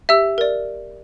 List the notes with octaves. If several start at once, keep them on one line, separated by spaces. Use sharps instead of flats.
G4 E5 E6
A#4 D5